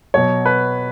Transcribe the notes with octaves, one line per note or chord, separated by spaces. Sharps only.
B2 F#3 C#5
B4